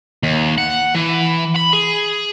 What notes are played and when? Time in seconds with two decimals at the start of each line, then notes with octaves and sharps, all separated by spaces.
0.23 D#2
0.58 F#5
0.95 E3
1.56 B5
1.73 G#4